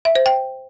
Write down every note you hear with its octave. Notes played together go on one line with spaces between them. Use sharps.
E5
C5
G5